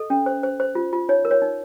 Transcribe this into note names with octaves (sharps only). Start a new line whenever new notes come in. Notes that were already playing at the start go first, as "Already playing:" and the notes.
Already playing: A4 D#5
C#4
C5
C5
C5
F4
F4
D#4 C#5
A#4
C#5
D#4